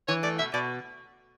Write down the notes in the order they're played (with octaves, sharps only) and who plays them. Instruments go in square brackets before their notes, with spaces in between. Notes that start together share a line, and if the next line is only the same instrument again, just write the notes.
[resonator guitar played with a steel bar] E3 [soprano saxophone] C#5
[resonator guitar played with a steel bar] A3 [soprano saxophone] D5
[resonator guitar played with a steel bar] B2 [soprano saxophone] E5
[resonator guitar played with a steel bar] B2 [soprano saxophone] D5